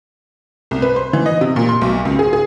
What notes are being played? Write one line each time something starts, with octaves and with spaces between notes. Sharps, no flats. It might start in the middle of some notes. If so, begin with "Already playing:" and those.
C2
B4
C5
E3
D#5
C3
A#2
C6
B1
C#2
G#4
G#4